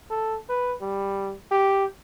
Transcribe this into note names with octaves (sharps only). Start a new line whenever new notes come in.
A4
B4
G3
G4